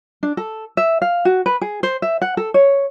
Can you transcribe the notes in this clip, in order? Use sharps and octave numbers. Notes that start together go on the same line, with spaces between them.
D4
A4
E5
F5
F#4
B4
G#4
C5
E5
F#5
A4
C#5